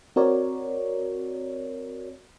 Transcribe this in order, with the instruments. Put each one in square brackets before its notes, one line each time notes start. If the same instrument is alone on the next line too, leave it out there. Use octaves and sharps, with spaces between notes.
[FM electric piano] C4 F#4 A#4 C#5 D5